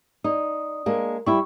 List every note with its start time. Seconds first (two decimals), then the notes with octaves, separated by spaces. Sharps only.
0.24 D#4 D5 D#6
0.86 G#3 A#3 D4
1.26 G3 E4 C#6